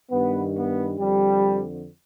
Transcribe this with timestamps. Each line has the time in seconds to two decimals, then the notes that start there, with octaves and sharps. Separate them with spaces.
0.11 G2 D#3 B3
0.56 B3
0.99 F2 D3 G3